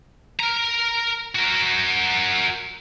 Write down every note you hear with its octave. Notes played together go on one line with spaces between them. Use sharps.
A#4 A#5
F#4 A#4